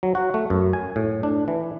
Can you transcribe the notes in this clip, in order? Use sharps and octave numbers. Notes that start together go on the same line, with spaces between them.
F#3
F#4
A3
F#2
G#5
A2
D4
E3